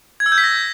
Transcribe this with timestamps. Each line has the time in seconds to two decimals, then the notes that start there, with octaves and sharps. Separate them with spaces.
0.20 G#6
0.26 E6
0.32 G6
0.38 B6
0.44 A#6